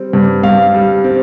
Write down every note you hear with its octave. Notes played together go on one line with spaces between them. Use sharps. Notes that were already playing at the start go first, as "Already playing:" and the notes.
Already playing: G3 C4
G2
G2 F5
G3
C4